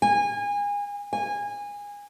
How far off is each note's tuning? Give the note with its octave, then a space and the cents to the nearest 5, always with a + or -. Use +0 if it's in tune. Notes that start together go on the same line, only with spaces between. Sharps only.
G#5 -30
G#5 -20